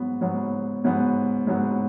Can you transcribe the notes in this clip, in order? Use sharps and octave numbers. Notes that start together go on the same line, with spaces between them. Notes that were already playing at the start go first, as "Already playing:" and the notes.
Already playing: G#2 F#3 B3
G#2 F#3 B3
G#2 F#3 B3
G#2 F#3 B3